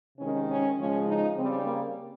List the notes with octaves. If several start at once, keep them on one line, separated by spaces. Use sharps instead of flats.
C3 D#3 G#3 C#4
C#4
C#3 F3 G#3 C#4
D#4
C#3 G3 C4
A#3